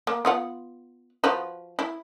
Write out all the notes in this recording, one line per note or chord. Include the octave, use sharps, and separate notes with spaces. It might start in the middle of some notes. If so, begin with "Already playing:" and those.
A#3
B3 F4 F#5
F3 F#4 B4
E4